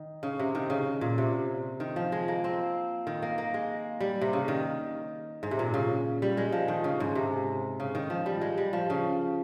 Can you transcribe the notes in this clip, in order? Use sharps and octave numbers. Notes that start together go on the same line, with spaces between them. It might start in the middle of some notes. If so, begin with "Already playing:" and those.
Already playing: D#3
C#3
C3
D#3
C#3
A#2
C3
D#3
F3
G#3
A#3
C4
D#3
A#3
A#3
G#3
G3
C3
C#3
D#3
G#2
C3
A#2
C#3
G3
G#3
F3
D#3
C#3
G#2
C3
C#3
D#3
F3
G3
G#3
G3
F3
C#3